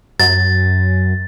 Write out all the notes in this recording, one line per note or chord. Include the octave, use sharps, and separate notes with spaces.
F#2 A6